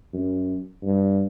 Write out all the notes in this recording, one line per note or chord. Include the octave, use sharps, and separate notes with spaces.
F#2
G2